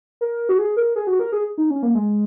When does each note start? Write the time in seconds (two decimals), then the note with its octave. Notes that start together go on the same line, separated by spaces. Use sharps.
0.21 A#4
0.49 F#4
0.58 G#4
0.77 A#4
0.96 G#4
1.07 F#4
1.19 A#4
1.32 G#4
1.58 D#4
1.70 C#4
1.82 A#3
1.94 G#3